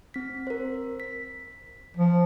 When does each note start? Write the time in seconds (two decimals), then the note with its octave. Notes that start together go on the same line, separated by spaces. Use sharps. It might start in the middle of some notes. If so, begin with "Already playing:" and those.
0.14 C4 B6
0.47 A#4 C5
1.00 B6
1.97 F3